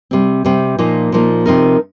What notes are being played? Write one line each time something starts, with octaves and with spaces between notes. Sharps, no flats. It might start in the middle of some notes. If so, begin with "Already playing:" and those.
C3 G3 C4
C3 G3 C4
A#2 F3 A#3 D#4
A#2 F3 A#3 D#4
C3 F3 C4 D#4 A#4